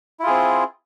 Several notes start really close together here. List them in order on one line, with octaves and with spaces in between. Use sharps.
E4 F4 G#4 C4